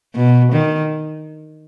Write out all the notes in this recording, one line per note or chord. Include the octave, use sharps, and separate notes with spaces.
B2
D#3